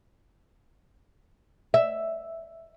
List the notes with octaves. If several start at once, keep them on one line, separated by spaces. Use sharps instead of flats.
E5